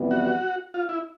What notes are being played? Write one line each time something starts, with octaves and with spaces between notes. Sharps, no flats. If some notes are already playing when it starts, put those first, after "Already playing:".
Already playing: F2 C3 E3 G3 B3
F#4
F4
E4